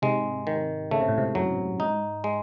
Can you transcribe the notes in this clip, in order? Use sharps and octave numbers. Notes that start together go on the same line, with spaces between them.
G#2 C3 G#3
D#3
C#3 A3
C3
A2
G#2 C3
F#2 A2 F#3
G#2 D#4
G#3